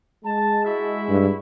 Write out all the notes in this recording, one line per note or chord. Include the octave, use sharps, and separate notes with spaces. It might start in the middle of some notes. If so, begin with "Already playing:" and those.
G#3 A5
E4 F#4 E5
G2